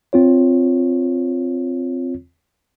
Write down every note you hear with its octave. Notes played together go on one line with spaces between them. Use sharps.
C4 F4 C#5